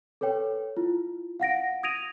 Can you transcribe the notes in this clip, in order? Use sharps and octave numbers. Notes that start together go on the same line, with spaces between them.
A4 B4 C#5 G5
E4 F4
F5 F#5 A#6 D7
D#6 G#6 A#6 D7 D#7 F7